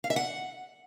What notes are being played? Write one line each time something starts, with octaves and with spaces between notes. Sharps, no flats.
F5
E5
F#5